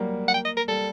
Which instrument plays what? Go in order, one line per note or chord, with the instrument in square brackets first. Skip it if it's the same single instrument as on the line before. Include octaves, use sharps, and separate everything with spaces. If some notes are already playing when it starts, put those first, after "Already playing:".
Already playing: [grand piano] F#3 G3 A#3
[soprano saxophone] F#5
G5
D#5
A#4
[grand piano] G3 [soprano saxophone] A4